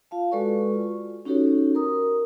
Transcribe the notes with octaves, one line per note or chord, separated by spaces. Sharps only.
F4 F5 A5
G#3 F#4 A4 B4 D5 C#6
F4
C#4 D#4 F#4 G4 A4 C#5
A#4 A#5 D#6